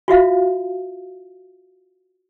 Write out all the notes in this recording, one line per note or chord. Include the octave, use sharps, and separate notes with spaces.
F4 F#4 E5 F5